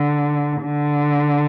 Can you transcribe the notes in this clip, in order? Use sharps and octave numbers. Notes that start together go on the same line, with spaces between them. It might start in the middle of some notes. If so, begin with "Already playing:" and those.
Already playing: D3
D3